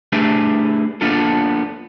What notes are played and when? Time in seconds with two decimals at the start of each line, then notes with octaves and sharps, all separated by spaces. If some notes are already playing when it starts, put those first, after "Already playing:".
0.12 A3 D4 E4 G4 G#4 B4
1.01 A#3 B3 D4 F4 A4